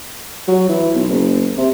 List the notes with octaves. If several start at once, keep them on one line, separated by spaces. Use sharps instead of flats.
F#3
E3
B1
F#1
C3